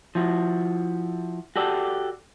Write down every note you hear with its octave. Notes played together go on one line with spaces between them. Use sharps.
F3 E4 F#4
F#4 G4 A4 D5